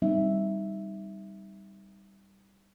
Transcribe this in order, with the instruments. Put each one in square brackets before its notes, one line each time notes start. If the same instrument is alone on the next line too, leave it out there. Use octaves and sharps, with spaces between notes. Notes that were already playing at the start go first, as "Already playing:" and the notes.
[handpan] G3 C4 D#4 E5